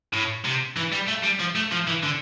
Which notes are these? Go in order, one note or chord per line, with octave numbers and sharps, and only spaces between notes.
A2
C3
E3
G3
A3
G3
F3
A3
F3
E3
D3